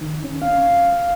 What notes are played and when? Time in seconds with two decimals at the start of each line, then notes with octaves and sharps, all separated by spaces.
0.01 D#3
0.24 C#4
0.42 F5